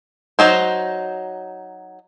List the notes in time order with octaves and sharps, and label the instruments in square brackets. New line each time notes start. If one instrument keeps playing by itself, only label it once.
[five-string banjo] F#3 D#4 C5